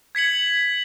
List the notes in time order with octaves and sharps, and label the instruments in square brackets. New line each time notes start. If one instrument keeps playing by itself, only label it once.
[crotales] G#6 B6 C#7 F#7